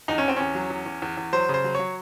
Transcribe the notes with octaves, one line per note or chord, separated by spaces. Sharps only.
E2 D#4
C#4
E2 C4
E2 C#4
F#3
E2
E2
E2
E2
F#3 C5
C#3 C5
F#3
F#3 C#5